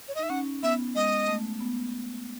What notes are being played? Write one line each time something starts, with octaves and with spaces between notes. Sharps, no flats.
C#5
D#5
D#4 E5
C#4 F#5
B3 E5
G#3 D#5
A3
B3